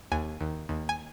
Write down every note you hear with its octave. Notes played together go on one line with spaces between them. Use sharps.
D#2 G#5
D#2
D#2
G#5